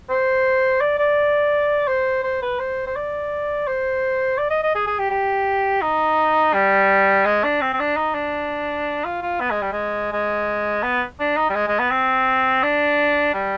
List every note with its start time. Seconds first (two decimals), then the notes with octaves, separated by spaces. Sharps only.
0.09 C5
0.81 D5
0.98 D5
1.88 C5
2.24 C5
2.42 B4
2.59 C5
2.86 C5
2.96 D5
3.67 C5
4.38 D5
4.50 D#5
4.63 D#5
4.75 G#4
4.87 G#4
4.99 G4
5.10 G4
5.82 D#4
6.54 G3
7.25 G#3
7.44 D4
7.61 C4
7.73 C4
7.79 D4
7.96 D#4
8.14 D4
9.05 F4
9.22 F4
9.40 B3
9.51 G#3
9.61 G3
9.72 G#3
10.12 G#3
10.83 B3
11.20 D4
11.37 D#4
11.49 G3
11.55 G#3
11.68 G#3
11.79 B3
11.90 C4
12.63 D4
13.34 G3